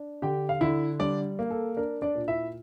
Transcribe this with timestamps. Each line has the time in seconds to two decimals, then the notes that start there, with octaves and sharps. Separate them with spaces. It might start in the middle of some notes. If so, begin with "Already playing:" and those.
Already playing: D4
0.22 D3 G4 G5
0.49 F5
0.61 D3 E4 E5
0.99 G3 D4 D5
1.39 A#3
1.50 A4
1.77 D4 A#4
2.02 D4 D5
2.15 A#2
2.28 E4 E5